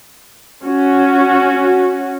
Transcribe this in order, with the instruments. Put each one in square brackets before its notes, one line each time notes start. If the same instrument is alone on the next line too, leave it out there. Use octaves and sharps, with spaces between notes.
[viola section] C#4 F#4